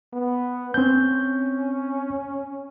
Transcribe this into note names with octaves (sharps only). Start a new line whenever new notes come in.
B3
C4 C#4 G6